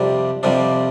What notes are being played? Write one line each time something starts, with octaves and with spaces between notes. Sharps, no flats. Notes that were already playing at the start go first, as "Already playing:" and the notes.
Already playing: F2 C3 G3 D4
F2 C3 G3 D4